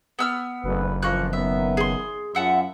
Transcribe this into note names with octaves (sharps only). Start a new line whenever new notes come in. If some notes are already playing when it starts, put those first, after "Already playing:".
B3 E6 F6
F#1 D2 B4
F2 E3 F3 A#3 C#6 F#6
D#3 F#3 B3 E5
G#4 C6
F#2 F4 E5 F#5 A5